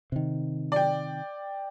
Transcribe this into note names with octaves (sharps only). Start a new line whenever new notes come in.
C3 D#3
D5 G5